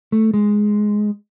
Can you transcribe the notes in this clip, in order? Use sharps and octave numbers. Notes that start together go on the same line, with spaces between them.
A3
G#3